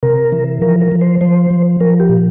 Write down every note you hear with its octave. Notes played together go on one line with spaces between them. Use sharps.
C3 A#4
E3
F3 A#4
A#4
F3
C5
F3 C5
F3
F3 A#4
G4
A#2